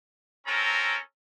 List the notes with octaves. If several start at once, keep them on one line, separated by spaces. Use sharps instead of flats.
C4 C#4 A4 A#4 A#5